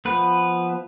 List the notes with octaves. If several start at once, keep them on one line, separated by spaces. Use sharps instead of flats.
F3 B3 B4